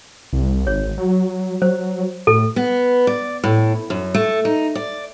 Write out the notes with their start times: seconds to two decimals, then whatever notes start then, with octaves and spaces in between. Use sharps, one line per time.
0.33 C2
0.67 G#1 C#5
0.98 F#3
1.62 F#3 C5
2.27 A2 A4
2.56 B3
3.07 D5
3.44 A2
3.90 F#2
4.14 A3
4.45 D#4
4.75 D5